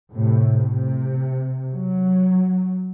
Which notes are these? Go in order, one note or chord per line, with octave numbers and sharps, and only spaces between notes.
A2 C3
C3
F#3